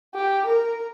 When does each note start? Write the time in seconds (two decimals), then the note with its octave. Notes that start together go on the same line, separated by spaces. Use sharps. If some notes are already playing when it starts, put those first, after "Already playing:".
0.15 G4
0.47 A#4